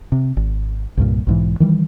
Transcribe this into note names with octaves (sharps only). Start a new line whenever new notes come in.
C3
G#1
C2 G2 A#2
B1 G#2 E3
D#3 E3 G3